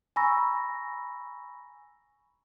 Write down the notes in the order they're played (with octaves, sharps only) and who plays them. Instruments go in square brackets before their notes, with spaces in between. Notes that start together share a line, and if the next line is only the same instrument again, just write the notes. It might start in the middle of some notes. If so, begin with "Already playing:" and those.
[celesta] G#5 A#5 B5 C#6 E6 A#6